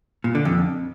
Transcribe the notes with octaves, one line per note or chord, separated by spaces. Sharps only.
A#2
D3
F2